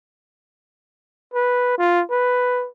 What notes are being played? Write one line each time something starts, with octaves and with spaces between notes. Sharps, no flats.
B4
F4
B4